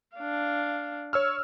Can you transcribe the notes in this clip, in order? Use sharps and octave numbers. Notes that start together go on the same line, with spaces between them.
D4 F5
C#5 E6 F6